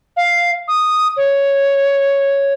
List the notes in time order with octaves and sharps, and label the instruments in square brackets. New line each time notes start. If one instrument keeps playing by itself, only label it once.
[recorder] F5
D#6
C#5